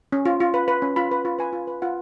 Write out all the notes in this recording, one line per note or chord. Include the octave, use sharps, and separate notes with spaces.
C#4
F4
F4
B4
B4
C#4
F4 B5
B4
F4
B4 G#5
F4
B4
F4 F#5